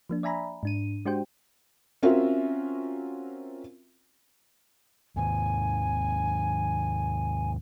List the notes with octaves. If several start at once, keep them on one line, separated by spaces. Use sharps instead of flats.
F3 A#3 D4
D5 E5 G#5 A#5 B5
G#2 D4 D#7
G#3 D4 F#4 G4 C5 G5
C4 C#4 F4 F#4 A#4 E5
D#2 G#2 D#3 G#5